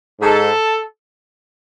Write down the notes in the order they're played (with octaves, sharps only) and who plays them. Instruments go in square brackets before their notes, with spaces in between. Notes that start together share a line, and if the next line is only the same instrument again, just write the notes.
[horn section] G#2 G#3 A4